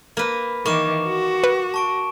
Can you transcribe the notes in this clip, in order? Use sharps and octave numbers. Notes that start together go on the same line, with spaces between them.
A#3 B4
D#3 E3 A#3 C#6 D6 E7
F#4
B4
A5 C#6 D7